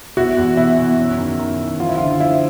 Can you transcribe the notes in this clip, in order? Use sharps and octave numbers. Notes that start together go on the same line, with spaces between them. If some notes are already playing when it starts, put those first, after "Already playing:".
B2 E4 F#4
E2
B2 E4
B2
F#2
D#3
D#3
D#3
F3 F4
E4
D3 F4
F3 E4